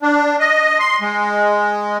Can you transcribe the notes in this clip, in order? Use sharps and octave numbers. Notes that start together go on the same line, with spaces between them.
D4
D#5
C6
G#3